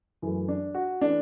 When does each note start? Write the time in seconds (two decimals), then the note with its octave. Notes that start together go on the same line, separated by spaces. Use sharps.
0.22 F#2 E3 A3
0.48 D4
0.75 F#4
1.01 E3 A3 D4